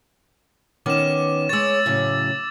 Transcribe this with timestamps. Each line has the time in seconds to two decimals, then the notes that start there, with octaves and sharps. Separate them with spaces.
0.86 D#3 B3 C#4 D6 E7
1.49 G#3 C#5 E6 A6
1.86 A2 C#3 F#3